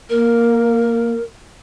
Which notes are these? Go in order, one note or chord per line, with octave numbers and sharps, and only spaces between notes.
A#3 A#4